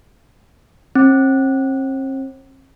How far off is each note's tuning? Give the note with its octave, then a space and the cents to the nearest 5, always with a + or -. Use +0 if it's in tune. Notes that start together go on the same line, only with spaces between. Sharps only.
C4 +45